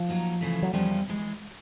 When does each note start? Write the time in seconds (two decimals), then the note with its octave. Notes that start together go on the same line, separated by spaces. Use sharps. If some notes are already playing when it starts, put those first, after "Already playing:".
Already playing: F3
0.09 F#3 A#3 D#4
0.41 C#3 E3 A3
0.63 F#3
0.73 E2 C#3 F3 G3 A#3 C#4
1.08 E3 G#3